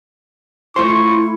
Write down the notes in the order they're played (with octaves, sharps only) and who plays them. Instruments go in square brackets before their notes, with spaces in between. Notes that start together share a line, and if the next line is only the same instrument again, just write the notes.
[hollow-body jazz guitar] A3 F4 C5 [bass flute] E4 [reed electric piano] C6 [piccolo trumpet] C#6